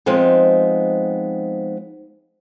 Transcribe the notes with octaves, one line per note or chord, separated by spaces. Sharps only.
F3 G#3 B3 C4 D#4